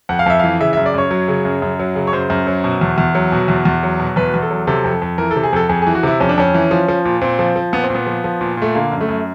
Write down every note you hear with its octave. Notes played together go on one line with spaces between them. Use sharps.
F2 F#5
F5
F2 E5
E3 F5
C#3 E5
E5
F#2
D5
F#2 C#5
F#3
C#3
F#2
F#2
F#3
C#3
C#5
F#2 C5
F#2
F#3
B2
E2
E2
F#3
B2
E2
E2
F#3
B2
E2 B4
E2
A4
F#3
C3 A4
F2
F2
E3 A#4
A4
C3
G#4
F2 A4
F2 G#4
G#4
E3
F#4
C3 E4
F2 C#4
D4
F2 C#4
E3
F3
F3
A#2
A#2 C4
F3
F3
A#2 B3
C4
A#2 B3
F3
F3
A#2
A#2 A3
D3 A#3
F#2
A3
F#2